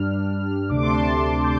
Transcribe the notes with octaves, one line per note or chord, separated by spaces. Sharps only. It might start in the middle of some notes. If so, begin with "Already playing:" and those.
Already playing: G2 G3 D4 F6
D2 C3 A3 D4 D6
C6
A5
C6
G6